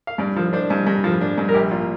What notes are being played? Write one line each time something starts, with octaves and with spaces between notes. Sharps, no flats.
F5
G2 D5
F3
D4 C5
G2
G2
F3
D4
G2
A#4
A#1 G4
A#2 F4